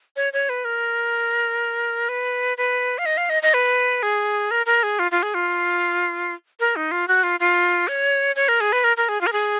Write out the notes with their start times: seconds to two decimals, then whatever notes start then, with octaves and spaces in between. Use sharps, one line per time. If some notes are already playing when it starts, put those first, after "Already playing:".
0.16 C#5
0.33 C#5
0.49 B4
0.65 A#4
2.09 B4
2.58 B4
2.98 F5
3.06 D#5
3.17 F5
3.30 D#5
3.43 D#5
3.54 B4
4.03 G#4
4.51 A#4
4.66 A#4
4.83 G#4
4.99 F4
5.11 F4
5.23 G#4
5.34 F4
6.60 A#4
6.76 D#4
6.91 F4
7.08 F#4
7.23 F4
7.40 F4
7.88 C#5
8.36 C#5
8.48 A#4
8.61 G#4
8.72 B4
8.84 A#4
8.97 A#4
9.09 G#4
9.21 F4
9.27 A#4
9.33 G#4